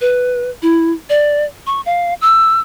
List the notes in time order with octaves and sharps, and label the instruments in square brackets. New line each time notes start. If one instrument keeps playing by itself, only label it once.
[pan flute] B4
E4
D5
C#6
F5
E6